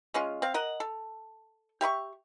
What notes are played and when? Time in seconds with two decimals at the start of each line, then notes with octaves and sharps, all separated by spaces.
0.14 G#3 C#4 F4
0.42 C4 F5
0.54 A#4 D#5 F#5
0.80 A4
1.81 G4 E5 B5 C#6